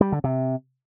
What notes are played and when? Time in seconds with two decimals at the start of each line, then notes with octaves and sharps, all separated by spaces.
0.01 G3
0.12 D3
0.24 C3